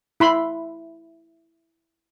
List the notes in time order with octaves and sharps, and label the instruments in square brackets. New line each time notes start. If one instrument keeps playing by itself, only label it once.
[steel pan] E4 B5 C6